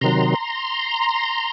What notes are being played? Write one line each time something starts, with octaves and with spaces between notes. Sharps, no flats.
C3 D#3 F#3 A#5 C6